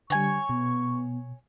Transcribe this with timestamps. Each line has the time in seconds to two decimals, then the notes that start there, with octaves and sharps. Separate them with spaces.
0.10 D3 G3 C#5 G#5 C#6
0.49 B2 B3